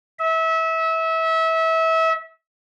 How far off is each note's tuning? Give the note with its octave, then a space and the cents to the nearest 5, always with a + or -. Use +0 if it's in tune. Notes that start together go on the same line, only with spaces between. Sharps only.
E5 -25